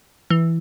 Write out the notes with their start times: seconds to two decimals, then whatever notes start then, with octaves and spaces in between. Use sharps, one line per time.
0.30 E3